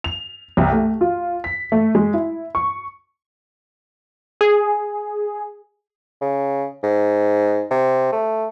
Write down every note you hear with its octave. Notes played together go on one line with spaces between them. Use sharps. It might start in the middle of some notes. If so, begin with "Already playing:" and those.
F7
C2
A3
F4
B6
A3
G#3
E4
C#6
G#4
C#3
G#2
C3
A3